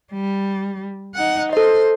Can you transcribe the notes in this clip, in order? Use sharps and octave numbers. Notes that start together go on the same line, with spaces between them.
G3
D#4 F#5
A4 C5 D#5